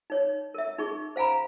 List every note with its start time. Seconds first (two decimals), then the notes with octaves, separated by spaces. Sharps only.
0.10 D#4 C#5
0.54 A#4 E5
0.78 D#4 G#4 C#6
1.16 C5 F5 G#5 A#5 B5